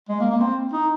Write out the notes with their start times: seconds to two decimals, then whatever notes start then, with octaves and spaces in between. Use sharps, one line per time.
0.09 G#3
0.20 A#3
0.31 A#3
0.41 C4
0.73 D#4